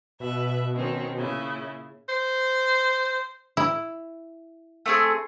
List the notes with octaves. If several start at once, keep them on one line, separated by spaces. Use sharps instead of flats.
B2 B4 E5
D#3 C4 C#4
A#2 C#3 E4
C5
E4
A3 C4 G#4